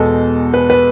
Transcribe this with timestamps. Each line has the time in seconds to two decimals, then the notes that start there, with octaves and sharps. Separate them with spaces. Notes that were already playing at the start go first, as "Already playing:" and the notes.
Already playing: E2 B2 G#3 A4
0.54 B4
0.70 B4